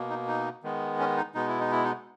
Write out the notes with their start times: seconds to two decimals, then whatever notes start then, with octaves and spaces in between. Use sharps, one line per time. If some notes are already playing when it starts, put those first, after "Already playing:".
Already playing: B2 A#3
0.10 D#4
0.27 D#4
0.63 D#3 G#3 B3
1.00 C#4
1.17 D#4
1.35 B2 G#3 B3 D#4
1.48 E4
1.60 D#4
1.72 E4
1.84 D#4